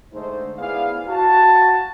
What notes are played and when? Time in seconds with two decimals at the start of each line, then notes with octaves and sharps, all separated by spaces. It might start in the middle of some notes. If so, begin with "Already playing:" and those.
0.13 D3 G#3 A3 D#4 C5
0.59 B3 E4 G#4 D5 F5
1.09 F#4 A5